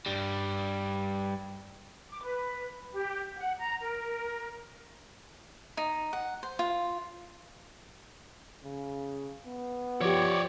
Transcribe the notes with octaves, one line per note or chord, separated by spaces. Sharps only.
G2 G3
D6
B4
G4
F#5
A#5
A#4
D#4
F#5
C5
F4
C#3
B3
F3 G4 C#5 D5